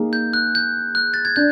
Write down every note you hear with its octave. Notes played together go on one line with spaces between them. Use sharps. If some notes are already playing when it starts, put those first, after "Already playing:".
Already playing: A#3 D#4 G#4
G6
F#6
G6
F#6
A6
G#6
D4 G6